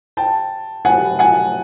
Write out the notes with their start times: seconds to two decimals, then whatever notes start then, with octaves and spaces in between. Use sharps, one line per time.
0.17 G5 A5
0.85 F#5 G#5
1.19 F#5 G#5